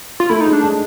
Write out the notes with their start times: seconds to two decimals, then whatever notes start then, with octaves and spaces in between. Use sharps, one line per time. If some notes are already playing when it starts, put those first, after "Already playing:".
0.20 F4
0.29 A3 E4
0.41 D#4
0.46 G#3
0.53 D4
0.63 G#3